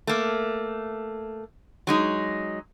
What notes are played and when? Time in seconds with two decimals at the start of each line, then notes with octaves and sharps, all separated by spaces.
0.07 A3 A#3
1.87 F#3 G#3 D#4